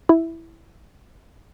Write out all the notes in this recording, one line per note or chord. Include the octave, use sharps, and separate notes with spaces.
E4